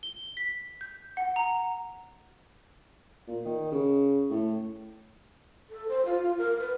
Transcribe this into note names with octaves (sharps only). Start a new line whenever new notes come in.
G7
B6
G6
F#5
A#5
A#2
D#3
C#3
A2
A4
C5
F4
F4
A#4
B4